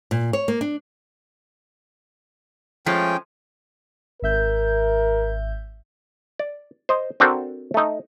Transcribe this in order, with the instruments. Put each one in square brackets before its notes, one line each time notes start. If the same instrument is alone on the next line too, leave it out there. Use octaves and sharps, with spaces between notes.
[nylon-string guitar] A#2
C#5
A#3
D4
[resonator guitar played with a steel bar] F3 G#3 A3 [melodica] C#4 G5
[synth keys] G#1 E5 G6 [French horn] A#4
[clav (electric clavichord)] D5
C5 D#5
C4 D4 F#4 A4 A#4 C5
A3 D#4